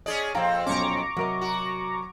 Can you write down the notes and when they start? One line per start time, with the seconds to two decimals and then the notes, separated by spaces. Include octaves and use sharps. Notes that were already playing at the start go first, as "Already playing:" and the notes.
0.06 C#4 G#4 D5 D#5
0.35 F2 A#2 C4 F5 G5 A#5
0.66 B1 C#4 A#5 C#6 D6
1.17 C3 F#3 A#4 D#5
1.41 F#4